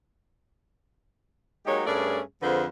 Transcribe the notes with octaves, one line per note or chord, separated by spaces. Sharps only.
F#3 G#3 A#3 D#4 G4 C#5
G2 A3 C#4 G#4 A#4 D5
F2 D3 F3 G#4 B4 C5